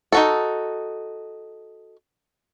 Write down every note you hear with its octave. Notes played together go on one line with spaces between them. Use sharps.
D#4 F#4 A4